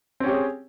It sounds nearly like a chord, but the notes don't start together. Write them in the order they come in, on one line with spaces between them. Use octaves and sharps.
C4 C#4 G4 C#5 G#4